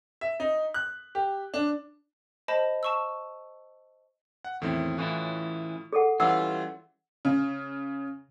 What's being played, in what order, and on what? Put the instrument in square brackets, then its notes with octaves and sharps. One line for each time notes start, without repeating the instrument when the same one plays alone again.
[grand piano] E5
D#4
F#6
G4
D4
[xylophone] C5 D#5 A5 B5
A5 C#6 E6
[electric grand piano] F#5
[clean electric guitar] E2 D#3 [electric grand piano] A2 C4 E4
[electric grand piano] A2 F4 [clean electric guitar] E3 C#4 E4
[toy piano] G#4 A4 F#5
[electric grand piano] E3 C#4 [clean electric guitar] G3 F4 [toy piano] F#5 E6
[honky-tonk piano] C#3